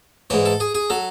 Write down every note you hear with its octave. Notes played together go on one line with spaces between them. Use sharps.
G#2 E3 C#5
A4
G#4
G#4
F#3 A4